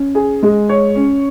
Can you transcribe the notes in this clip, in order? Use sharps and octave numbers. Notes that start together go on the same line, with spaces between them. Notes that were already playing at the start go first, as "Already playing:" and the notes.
Already playing: C#4
G#4
G#3
C#5
C#4